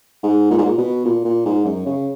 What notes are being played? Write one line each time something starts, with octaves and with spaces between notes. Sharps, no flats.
G#2
A#2
G#2
A#2
B2
A#2
A#2
G#2
F#2
C#3